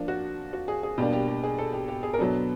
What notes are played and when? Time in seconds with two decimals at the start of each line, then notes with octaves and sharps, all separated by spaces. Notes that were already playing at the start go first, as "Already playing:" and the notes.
Already playing: F3 A#3 D4
0.08 F#4
0.53 F#4
0.68 G#4
0.83 G#4
0.98 B2 G3 A#3 D4 G4
1.13 G4
1.28 G4
1.44 G#4
1.58 A4
1.73 G4
1.88 G4
2.03 G#4
2.13 A#4
2.18 B2 F#3 B3 D4 A4